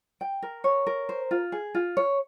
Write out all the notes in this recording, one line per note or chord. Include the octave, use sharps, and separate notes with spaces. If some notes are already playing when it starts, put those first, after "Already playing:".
G5
A#4
C#5
A#4
C5
F4
G#4
F4
C#5